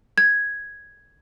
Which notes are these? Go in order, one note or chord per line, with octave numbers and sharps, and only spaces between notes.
G#6